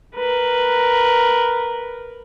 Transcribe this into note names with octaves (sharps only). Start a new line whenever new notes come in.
A#4 B4